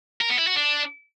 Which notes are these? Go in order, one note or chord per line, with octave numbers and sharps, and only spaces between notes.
A#4
B3
E4
F#4
D4